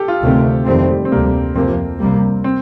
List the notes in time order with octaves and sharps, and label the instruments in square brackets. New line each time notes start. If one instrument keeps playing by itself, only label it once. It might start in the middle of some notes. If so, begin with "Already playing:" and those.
Already playing: [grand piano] G4 A4
F4
[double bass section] D2 C3 D#3 A3 C4
[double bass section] F2 D#3 A3 C4 [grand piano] G3
[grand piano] G3
C4
[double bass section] D2 C3 G3 [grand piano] A#3
[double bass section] F2 C3 F3 A#3 [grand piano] C4
[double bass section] C2 C3 G3 A#3
[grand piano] C4